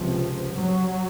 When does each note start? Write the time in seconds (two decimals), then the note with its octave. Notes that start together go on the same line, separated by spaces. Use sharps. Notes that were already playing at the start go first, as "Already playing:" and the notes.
Already playing: C#2 C3 F3
0.54 F#3